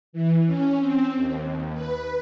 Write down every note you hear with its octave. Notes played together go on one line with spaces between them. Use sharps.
E3
C#4
C4
D#2
B4